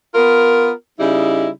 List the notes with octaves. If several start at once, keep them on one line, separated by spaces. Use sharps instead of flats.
B3 F4 A#4
C#3 G3 D#4 E4